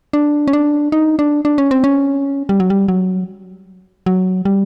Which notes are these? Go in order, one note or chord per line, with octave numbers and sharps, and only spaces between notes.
D4
C#4
D4
D#4
D4
D4
C#4
C4
C#4
G3
F#3
G3
F#3
F#3
G3